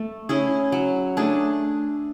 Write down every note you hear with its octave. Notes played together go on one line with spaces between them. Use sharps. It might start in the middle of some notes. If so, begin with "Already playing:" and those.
Already playing: A3
C#4 E4 G#4
F#3
A3 D4 G#4